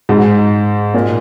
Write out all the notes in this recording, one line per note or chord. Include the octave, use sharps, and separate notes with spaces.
G#2
A#2